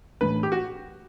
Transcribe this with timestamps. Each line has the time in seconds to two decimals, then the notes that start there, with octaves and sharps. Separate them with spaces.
0.21 A2 E3 A3 D4 B4
0.43 G4
0.52 F#4